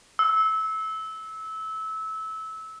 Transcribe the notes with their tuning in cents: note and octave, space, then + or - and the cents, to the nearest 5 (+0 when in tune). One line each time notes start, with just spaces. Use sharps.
E6 -20